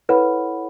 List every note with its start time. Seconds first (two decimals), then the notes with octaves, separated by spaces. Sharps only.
0.09 E4 A4 B4 C#5 F#5 B5